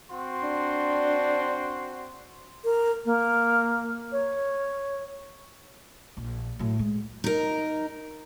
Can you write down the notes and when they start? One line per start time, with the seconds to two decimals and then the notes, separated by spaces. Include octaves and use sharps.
0.11 C4 F#4 C6
0.42 D4
2.65 A#4
3.06 A#3
4.12 C#5
6.17 A#1
6.59 A2 F#3
6.79 G#3
7.24 D#4 A#4